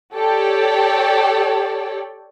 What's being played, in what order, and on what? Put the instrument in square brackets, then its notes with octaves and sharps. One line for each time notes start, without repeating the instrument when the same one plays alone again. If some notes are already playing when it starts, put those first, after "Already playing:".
[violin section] G4 A4 C#5 D5 G5